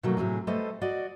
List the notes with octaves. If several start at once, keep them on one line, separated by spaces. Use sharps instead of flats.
B2 D#3 F3 F#3 A3 A#3
A2 C3 F#3 G#4
G3 A3 A4 B4 C5 D#5
F#4 D5 D#5